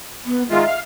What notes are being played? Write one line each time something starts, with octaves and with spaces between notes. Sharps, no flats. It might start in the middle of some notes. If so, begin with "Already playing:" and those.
B3
D#3 G#3 F4 E5
F5